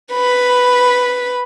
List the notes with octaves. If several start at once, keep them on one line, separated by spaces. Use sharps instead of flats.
B4 B5